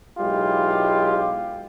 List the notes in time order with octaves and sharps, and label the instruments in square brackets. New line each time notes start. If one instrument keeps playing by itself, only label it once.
[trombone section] B1 G#3 E4 F4 G4